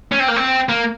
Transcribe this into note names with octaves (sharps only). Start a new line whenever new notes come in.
C#4
C4
A#3
C4
A#3